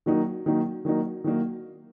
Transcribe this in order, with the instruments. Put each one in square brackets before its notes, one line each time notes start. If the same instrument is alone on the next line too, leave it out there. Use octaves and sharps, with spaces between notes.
[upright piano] D#3 F#3 A#3 D#4
D#3 F#3 A#3 D#4
D#3 F#3 A#3 D#4
D#3 F#3 A#3 D#4